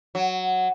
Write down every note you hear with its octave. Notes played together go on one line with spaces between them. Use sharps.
F#3